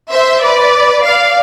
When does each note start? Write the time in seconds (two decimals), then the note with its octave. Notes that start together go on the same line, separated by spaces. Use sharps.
0.12 C5 E5
0.43 B4 D5
1.04 D5 F5